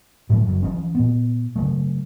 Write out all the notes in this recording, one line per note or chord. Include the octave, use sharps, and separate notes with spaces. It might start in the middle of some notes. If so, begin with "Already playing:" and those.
A2 F3 F#3 A3
F#1 F#3
E3 F3 C#4
A#2 B3
C#3 F#3 A3